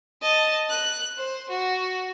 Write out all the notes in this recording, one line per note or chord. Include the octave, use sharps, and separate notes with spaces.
D#5 A5
F#6
C5
F#4